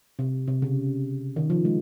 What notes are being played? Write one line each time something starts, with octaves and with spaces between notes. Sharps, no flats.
C3
C3
C#3
D#3
F3
G#3